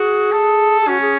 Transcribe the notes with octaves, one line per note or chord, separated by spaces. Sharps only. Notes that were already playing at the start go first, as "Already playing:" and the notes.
Already playing: F#4 G#4
A4
G#4
C#4 F#4
G#4